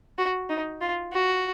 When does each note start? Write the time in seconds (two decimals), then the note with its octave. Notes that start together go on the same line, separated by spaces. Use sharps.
0.18 F#4
0.50 D#4
0.81 F4
1.12 F#4